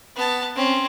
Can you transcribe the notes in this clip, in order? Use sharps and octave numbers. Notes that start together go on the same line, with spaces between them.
B3 A5
C4 C#4